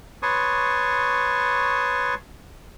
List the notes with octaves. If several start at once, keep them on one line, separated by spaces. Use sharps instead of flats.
B4 C#5 A5 C6 C#6 D#6